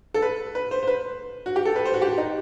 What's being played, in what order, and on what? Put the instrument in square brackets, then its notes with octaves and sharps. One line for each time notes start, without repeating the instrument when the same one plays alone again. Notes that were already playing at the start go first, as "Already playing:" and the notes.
[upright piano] A4
B4
B4
C5
C5
B4
F#4
G4
A4
B4
C5
F#4
G4
D#4